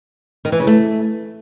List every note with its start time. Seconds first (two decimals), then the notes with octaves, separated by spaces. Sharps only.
0.45 D#3
0.52 E3
0.60 C#3
0.67 A3